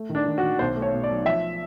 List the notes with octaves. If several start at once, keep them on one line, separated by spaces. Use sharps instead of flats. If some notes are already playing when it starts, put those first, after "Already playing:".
Already playing: A3
D#3
D4
D#3
F#4
D#3
B1 C5
A3
C#5
B2
D5
F#3
F3 E5